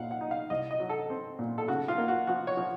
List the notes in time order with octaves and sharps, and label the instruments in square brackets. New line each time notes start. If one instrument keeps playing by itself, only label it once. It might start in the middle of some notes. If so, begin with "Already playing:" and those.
Already playing: [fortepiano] A#2 F5 F#5
F#5
D#4
F5
C2 D#5
D#5
F#3
A4
C4
A#2
A4
C#3 F#4
F4
A#3
F#4
F3 F#4
C#5
F3